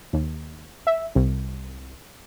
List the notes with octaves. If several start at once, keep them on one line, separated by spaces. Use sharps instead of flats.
D#2
E5
C2